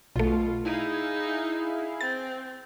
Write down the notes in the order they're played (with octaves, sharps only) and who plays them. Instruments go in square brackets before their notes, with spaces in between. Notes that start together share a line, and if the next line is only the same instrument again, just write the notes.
[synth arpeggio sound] B1 A3 [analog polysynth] B2 F4
[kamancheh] D#4 [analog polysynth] E4 G#4 F5
[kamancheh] C4 [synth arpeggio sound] A6